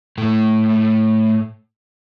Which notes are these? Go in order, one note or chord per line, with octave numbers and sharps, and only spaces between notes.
A2 A3